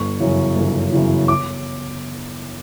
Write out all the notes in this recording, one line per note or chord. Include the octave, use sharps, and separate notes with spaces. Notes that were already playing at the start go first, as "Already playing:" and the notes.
Already playing: G1 C#6
F#2 C#3 E3
G1
F#2 C#3 E3
D6